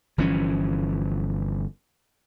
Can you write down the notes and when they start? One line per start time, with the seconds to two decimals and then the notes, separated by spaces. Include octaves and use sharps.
0.18 G1 E3 F3 C#4